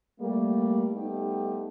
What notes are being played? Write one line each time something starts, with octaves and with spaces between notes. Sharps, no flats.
G3 A3 A#3
G3 A3 B3 D#4 G4